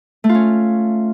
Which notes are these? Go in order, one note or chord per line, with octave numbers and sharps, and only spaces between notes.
A3
F4
C#4